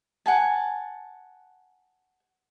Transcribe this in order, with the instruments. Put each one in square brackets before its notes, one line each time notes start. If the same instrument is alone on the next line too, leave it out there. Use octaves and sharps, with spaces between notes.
[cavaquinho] F#5 G#5 A5